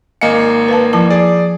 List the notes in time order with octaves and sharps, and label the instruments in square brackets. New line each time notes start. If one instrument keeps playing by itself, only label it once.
[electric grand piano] G#1 A#3 C#7 [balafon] D#5 F5 G#5
[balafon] B4 F5 A5
F3 E4 A5
[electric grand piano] G#4 D5